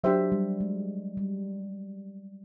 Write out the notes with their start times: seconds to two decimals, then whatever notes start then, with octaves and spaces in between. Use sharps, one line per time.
0.04 F#3 D4 G4 C5 E5
0.32 G3
0.61 G#3
1.17 G3